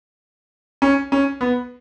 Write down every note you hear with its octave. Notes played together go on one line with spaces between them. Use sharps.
C#4
C#4
B3